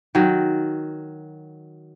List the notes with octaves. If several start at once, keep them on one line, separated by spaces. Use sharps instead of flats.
D#3 F#3